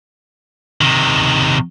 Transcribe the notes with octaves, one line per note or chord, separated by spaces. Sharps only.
C3 D#3